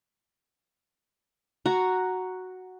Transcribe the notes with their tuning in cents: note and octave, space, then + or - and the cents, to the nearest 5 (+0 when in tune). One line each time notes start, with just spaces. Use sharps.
F#4 +0 A#5 +0